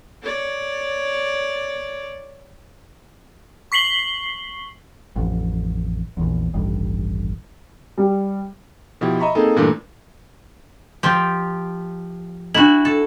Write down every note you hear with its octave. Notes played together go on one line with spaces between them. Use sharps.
C#5 D5
C#6 B6 C7 F#7 G7
A1 F2
A#1 E2
D#1 A1 G2
G3
B2 F3 E4 G4
D#5 E5 A#5 B5 C#6
A#3 C4 D#4 G#4 A4
G2 A#2 E3 A3 A#3 D4
F3 G4
D4 E4 F#4 F#7
A4